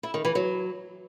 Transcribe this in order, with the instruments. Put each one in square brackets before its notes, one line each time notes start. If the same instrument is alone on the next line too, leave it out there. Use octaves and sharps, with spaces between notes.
[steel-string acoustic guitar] E4
D#3
E3
F#3